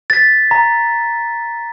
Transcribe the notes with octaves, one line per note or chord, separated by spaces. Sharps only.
A6 B6
A#5